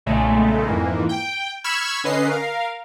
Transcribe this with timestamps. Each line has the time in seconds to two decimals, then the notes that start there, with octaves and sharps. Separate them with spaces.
0.06 B1 A#2 C#3 G#3 A3
0.66 F2 G#2 E3 A#3
1.09 G5
1.64 B5 C#6 E6 F6 G#6 E7
2.04 D3 C#4 B4 D#5 C7
2.27 A#4 F5